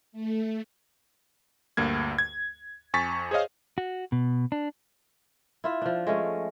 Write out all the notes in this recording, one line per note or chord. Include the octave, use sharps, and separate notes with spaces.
A3
D2 G2 A#3 G#6
G#6
F2 G#5 C#6 A6 B6
G#4 C5 C#5 D#5 F5
F#4
B2
D4
E4 F4 E5
F3 D4
G#3 A3 C#4